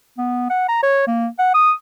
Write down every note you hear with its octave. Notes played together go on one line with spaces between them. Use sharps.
B3
F#5
A#5
C#5
A#3
F#5
D#6